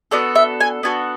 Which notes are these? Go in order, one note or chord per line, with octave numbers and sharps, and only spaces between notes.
B3 D4 F#4 A4 D5
E5
G#5
B3 D4 F#4 A4 G#5